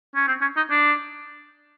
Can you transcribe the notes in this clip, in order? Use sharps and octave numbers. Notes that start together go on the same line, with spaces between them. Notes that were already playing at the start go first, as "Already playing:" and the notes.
C#4
C4
C#4
D#4
D4